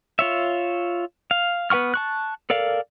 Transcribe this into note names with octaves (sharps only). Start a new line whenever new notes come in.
F4 C#5 E5
F5
B3 B4 F#5 C#6 F6
A5 C#6 F#6
A4 A#4 D5 F5